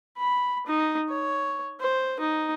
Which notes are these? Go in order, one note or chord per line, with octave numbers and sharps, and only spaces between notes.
B5
D#4
C#5
C5
D#4